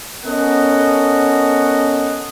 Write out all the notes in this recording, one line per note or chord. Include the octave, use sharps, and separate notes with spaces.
B3 C#4 A4 A#4 D#5 F#5